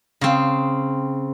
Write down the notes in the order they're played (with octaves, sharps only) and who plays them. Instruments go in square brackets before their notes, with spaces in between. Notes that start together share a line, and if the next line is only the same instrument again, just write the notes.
[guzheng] C#3 C4